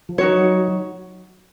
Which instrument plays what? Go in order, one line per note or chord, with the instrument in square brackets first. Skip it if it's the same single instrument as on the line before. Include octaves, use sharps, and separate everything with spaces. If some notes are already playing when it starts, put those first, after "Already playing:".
[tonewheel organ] F3
[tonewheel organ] F#3 [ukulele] D#4 F#4 C#5